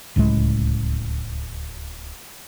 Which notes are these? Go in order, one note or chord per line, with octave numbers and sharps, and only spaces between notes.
D1 C#2 A2 G#3